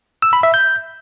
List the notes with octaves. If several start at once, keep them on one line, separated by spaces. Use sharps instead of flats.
E6
B5
E5
G6